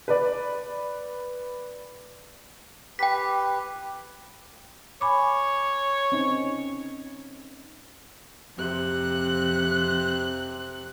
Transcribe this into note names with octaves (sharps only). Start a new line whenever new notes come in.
B4 D5
G4 B4 G5 B6
C#5 G#5 B5 D6
C4 C#4 D#4
F2 C3 F#6